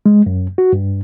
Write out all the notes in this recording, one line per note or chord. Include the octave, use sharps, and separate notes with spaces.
G#3
F#2
F#4
G2